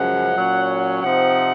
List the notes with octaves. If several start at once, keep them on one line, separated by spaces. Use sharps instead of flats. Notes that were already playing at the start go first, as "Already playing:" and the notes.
Already playing: F#2 C#3 F3 G#3 F#5
A#2 F#3 C#4
C3 F3 C4 D#4 F#5